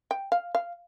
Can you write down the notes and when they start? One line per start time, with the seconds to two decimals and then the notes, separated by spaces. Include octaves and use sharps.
0.11 G5
0.32 F5
0.55 F5